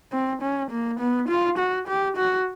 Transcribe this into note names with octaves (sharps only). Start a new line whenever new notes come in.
C4
C#4
A#3
B3
F4
F#4
G4
F#4